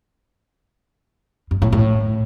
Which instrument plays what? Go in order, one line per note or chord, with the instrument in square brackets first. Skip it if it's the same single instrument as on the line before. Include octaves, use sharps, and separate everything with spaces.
[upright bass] G2
A2
A2